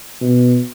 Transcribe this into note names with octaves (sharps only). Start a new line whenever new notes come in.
B2